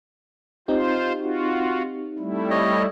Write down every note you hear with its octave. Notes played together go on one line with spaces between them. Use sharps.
C4 D#4 F4 G4 C5
F4 F#4
G3 A3 E4
C#5 D#5